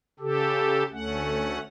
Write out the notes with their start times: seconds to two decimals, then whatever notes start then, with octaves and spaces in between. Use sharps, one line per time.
0.20 C#3 G4 A4
0.92 D2 A3 C#4 F#5